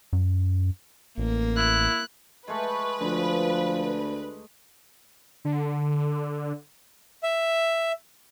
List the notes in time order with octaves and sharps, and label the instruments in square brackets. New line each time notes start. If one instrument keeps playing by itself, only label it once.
[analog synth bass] F#2
[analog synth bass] A1 [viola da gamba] A#3
[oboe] E4 [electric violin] F#6
[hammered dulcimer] G#3 A3 [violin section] B4
[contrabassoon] D2 [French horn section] F3
[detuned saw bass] D3
[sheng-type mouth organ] E5